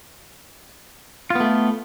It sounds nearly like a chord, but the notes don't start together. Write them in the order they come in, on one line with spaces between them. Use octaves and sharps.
F4 B3 A3